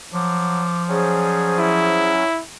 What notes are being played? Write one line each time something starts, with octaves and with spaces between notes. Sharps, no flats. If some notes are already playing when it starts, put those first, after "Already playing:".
F3 F#3 D6
F#3 C#4 G#4 C5 D5
E4